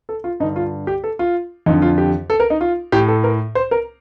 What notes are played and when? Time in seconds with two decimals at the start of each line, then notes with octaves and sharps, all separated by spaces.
0.09 A4
0.24 F4
0.40 G2 D3 D#4
0.56 F4
0.87 G4
1.04 A4
1.19 F4
1.66 F2 D3 D#4
1.82 F4
1.98 G4
2.30 A4
2.40 A#4
2.50 D#4
2.61 F4
2.92 A2 G4
3.08 A4
3.24 A#4
3.55 C5
3.71 A#4